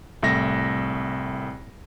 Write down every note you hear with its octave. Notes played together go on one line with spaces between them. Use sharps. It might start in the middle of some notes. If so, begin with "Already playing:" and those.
C2 A2 E5 A#6